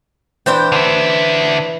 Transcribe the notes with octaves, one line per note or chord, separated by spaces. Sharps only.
E3 D4 C5 G5
D3 E5